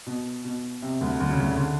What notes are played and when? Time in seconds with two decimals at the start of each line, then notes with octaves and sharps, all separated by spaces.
0.06 B2
0.44 B2
0.82 C3
1.01 D2 D3
1.20 D2 D3
1.31 C#3
1.39 D2 D3
1.51 C#3
1.57 D3